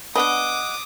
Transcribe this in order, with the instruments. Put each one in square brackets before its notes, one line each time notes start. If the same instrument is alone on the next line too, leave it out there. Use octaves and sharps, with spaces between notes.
[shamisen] B3 D4 B4 [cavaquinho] D#5 F#5 [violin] D6 D#6